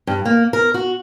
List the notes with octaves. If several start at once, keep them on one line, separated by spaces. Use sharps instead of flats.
G2
A#3
A#4
F#4